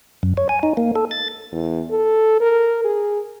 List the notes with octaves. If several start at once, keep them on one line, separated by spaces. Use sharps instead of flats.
F#2
C#5
G#5
D#4
A#3
A4
A6
E2
A4
A#4
G#4